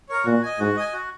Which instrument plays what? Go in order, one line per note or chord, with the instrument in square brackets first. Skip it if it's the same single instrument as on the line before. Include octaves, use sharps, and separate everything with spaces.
[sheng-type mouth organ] A#4 C#5
[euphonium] A#2 [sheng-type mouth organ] F#4
[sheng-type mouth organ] D#5 G#5
[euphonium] G#2 [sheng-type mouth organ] F#4
[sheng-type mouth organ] D#5 G#5
F#4